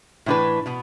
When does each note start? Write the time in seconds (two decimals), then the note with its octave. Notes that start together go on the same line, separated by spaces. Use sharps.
0.26 A2 E3 D4 B4
0.66 B2 B3